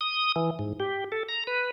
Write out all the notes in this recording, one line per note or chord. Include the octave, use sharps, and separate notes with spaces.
D#6
E3
G#2
G4
A4
A#5
B4